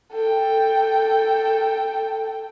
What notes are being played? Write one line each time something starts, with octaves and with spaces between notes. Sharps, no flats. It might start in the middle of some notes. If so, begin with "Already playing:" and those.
A4 G5